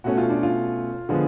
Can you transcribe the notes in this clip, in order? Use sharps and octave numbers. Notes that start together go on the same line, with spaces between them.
B2 A3 C#4 F#4
F4
D4
F4
D3 F3 G#3 B3